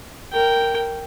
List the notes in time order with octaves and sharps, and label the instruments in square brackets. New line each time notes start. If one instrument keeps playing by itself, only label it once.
[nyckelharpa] A#4 G5